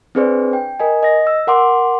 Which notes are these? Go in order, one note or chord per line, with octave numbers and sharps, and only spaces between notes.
C4 D4 G#4 B4 C5 D5
G5
A#4 D#5 G#5
D#5 A#6
E6
A#4 F#5 C6 D6